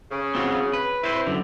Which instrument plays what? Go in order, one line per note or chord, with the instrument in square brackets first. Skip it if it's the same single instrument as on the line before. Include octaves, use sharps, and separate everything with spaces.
[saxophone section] C#3
[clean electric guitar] C4 F4 F#4
B4
[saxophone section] C4 E4 [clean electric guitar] B4 C5
[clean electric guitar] F#2 D3